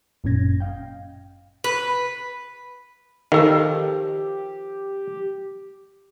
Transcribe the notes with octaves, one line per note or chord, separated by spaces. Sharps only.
G1 F#2 A#2 C#4 G#6 A#6
D#5 F5 G5
B4
D#3 F3 G4 A4 F5